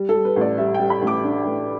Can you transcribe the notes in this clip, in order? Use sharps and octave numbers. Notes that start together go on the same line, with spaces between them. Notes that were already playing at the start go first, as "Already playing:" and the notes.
Already playing: G3
A4
G3
B4
A1 D5
G3 E5
G5
G3
B5
A1
D6
D4
A1